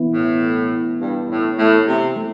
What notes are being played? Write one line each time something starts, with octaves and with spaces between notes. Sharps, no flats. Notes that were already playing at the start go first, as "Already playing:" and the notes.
Already playing: E3 B3 E4
A2
G2
A2
A2
C3
A3 E4 A4